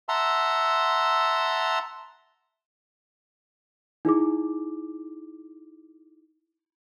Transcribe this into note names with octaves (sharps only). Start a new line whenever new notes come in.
E5 F#5 A5 A#5 C6 E6
D#4 E4 G#4 D6